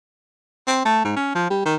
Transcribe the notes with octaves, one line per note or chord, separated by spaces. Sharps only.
C4
A3
G#2
C#4
F3
G3
D#3